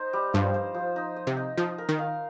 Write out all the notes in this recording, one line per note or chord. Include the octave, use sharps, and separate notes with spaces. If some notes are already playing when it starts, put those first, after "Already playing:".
Already playing: D#4 C5
G3
G2 F3
C5
F3
D#4
D#5
C3
D#4
F3 D#4
A#4
D#3
F5